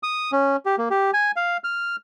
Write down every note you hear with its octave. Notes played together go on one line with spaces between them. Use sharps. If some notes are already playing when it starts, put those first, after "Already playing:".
D#6
C#4
G4
A#3
G4
G#5
F5
F6